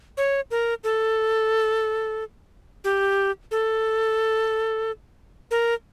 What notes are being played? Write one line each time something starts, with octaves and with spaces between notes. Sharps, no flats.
C#5
A#4
A4
G4
A4
A#4